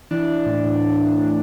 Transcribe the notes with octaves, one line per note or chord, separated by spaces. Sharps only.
E3 D4
E3
A2
A2